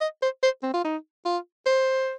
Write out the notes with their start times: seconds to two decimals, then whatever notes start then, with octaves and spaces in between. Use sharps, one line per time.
0.01 D#5
0.22 C5
0.43 C5
0.63 C4
0.74 F4
0.84 D#4
1.26 F4
1.66 C5